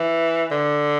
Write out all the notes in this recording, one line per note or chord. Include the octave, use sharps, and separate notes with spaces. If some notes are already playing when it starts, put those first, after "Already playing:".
Already playing: E3
D3